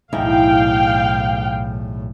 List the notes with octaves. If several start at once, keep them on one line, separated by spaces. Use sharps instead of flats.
B1 E2 A2 D#4 E4 F5 G5